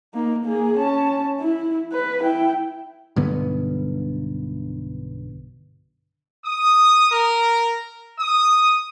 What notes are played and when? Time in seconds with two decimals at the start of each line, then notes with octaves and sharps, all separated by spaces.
0.14 A#3 D#4
0.45 A#3 G#4
0.77 C#4 A5
1.40 E4
1.92 B4
2.23 E4 G5
3.16 B1 G2 D3 B3
6.46 D#6
7.12 A#4
8.19 D#6